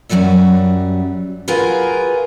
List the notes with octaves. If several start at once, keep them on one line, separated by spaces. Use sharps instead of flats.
F#2 C3 F#3 G3 E5
F4 F#4 G#4 A#4 B4